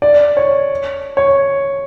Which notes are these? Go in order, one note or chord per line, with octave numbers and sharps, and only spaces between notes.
D5
C#5
C#5